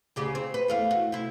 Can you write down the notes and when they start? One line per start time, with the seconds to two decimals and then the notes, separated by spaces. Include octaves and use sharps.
0.16 D2 C#3 G4
0.35 C4
0.54 B4
0.68 E2 A3 F5
0.91 F#4
1.12 C3 E4